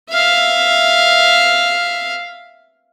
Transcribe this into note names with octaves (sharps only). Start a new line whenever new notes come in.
E5 F5